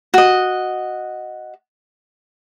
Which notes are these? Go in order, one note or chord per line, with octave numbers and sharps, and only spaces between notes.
F#4 D#5